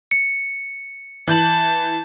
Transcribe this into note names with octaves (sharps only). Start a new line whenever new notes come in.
C#7
E3 A5 G6 F#7